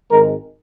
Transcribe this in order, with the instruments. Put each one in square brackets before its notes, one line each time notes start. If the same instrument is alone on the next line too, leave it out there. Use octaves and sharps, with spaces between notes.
[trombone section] G#1 G#2 D#3 G#3 A#4